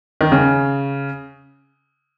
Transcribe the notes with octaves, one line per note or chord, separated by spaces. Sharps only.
D#3
C#3